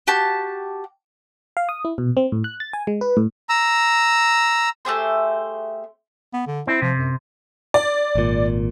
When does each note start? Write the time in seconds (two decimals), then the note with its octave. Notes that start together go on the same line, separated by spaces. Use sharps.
0.07 F#4 G4 A5
1.57 F5
1.69 D#6
1.85 E4
1.98 B2
2.17 C4
2.32 A2
2.44 F#6
2.60 A6
2.73 G#5
2.87 G#3
3.01 B4
3.17 A2
3.49 A#5 E6
4.85 A3 G4 G#4 C5
6.33 B3
6.46 D3
6.67 C4 E4
6.82 C3 F3
6.98 F#2
7.74 D5
8.15 G#1 A#2